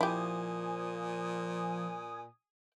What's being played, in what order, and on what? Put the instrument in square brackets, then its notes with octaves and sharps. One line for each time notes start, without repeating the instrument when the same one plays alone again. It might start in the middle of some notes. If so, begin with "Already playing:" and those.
[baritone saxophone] A#2 [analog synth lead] F3 [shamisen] E4 G4 [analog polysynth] G#5 D#6